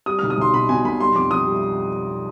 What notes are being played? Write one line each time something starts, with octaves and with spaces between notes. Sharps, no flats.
G3 D#6
B1 F6
D#6
B1 C6
B2 B5
B2 G#5
B1 B5
G3 C6
F2 D6
F2 D#6
G3